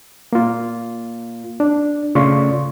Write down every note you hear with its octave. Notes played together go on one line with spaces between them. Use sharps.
A#3 F4
D4
C#3 A3 F4 D5 C6 C#6